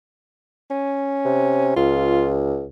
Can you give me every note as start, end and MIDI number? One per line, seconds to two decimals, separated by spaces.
0.71 1.74 61
1.25 1.74 48
1.76 2.67 37
1.76 2.40 65